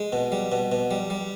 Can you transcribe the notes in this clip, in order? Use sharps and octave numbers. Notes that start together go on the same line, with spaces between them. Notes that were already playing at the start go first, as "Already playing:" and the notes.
Already playing: G#3
B2
G3
B2
B2
G3
G3